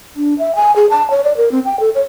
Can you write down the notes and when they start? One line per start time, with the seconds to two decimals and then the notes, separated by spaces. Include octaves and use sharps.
0.16 D4
0.38 E5
0.55 G#5
0.76 G#4
0.90 A5
1.10 C#5
1.24 D5
1.37 A#4
1.51 C4
1.65 G5
1.80 A4
1.95 C#5